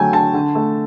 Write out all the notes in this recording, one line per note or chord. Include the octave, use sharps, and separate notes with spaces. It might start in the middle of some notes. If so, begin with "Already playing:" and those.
Already playing: D3 F#3 A3 G5 G#5
D3 A5
D3
A3